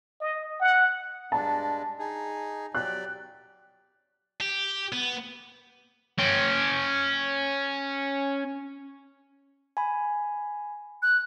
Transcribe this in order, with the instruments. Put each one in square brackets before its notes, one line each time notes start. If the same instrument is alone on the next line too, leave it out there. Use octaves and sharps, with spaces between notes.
[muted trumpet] D#5
F#5
[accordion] G2 G#3 D4 [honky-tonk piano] A5
[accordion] D#4 G#4
[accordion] F#3 G4 D5 [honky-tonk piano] F#6
[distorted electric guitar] G4
B3
C#4 G5
[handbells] G#5 B5
[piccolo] F#6